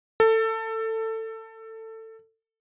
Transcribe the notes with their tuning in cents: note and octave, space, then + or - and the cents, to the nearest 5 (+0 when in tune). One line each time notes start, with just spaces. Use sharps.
A4 +20